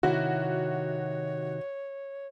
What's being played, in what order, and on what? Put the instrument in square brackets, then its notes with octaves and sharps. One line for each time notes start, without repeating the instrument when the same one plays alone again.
[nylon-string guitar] C3 D#3 E4 [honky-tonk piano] F#4 [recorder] C#5